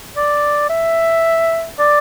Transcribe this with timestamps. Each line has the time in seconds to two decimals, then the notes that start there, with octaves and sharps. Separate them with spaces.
0.17 D5
0.70 E5
1.79 D5